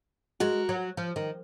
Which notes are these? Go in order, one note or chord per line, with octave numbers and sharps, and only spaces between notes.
G#3 F#4 A#4
F#3
F3
D#3